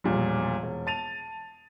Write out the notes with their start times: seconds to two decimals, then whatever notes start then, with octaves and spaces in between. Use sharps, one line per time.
0.04 E1 A#1 A#2 G3
0.63 E1
0.87 A5 A6 D#7 F7